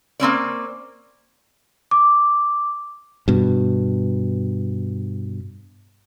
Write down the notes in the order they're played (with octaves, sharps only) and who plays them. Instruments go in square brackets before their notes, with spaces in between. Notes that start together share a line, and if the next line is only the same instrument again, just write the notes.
[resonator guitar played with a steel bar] A#3 C4 C#4 D5
[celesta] D6
[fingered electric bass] G2 B2